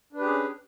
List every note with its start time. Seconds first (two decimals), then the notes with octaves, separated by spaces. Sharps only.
0.13 D4
0.16 B4
0.20 G4
0.24 G#4
0.28 C#4